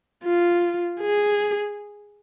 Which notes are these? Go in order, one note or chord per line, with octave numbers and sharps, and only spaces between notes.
F4
G#4